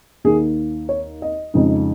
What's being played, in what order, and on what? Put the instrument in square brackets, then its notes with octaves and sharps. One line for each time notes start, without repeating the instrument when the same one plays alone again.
[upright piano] D#2 D#3 A#3 D#4 G#4
C#5
D#5
F2 C#3 G#3 D#4